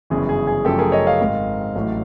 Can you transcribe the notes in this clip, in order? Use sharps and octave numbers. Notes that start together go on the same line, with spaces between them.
G1 F#2 C#3 E3 G#4
G#4
G#4
F#2 C#3 F3 A3 G4 A4
G#4 A#4
C#5 D#5
D#5 F5
G#1 G#2 D#3
A1 A2 F#3 A3